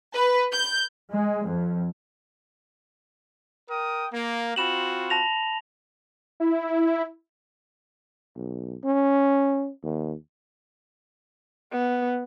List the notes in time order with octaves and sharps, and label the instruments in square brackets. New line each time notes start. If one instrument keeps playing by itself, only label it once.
[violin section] B4
G6
[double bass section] G#3
F2
[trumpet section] A#4 G5 D#6
A#3
[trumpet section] C4 F4 F#4 [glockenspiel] B5 E7 F#7
[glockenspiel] A5 A#6 F7
[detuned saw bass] E4
[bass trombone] B1
C#4
D#2
[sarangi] B3